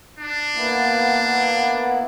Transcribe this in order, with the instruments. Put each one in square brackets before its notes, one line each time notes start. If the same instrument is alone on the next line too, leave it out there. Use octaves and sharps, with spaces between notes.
[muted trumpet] D4
[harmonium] A#3 B3 E4